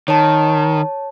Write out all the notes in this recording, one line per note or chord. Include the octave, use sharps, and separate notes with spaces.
D#3 C#5 A5